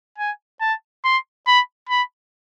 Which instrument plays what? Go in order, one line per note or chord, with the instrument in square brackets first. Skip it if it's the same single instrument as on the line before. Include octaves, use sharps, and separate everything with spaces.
[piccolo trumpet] G#5
A5
C6
B5
B5